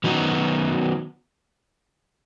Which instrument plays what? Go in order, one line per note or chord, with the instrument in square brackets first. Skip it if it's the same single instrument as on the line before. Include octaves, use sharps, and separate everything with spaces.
[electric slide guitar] D#3 F#3 B3 D#4 F#4